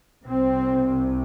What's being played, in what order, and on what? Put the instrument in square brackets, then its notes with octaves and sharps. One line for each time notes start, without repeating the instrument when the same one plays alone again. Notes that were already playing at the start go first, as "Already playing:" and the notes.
[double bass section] C2 C3 C4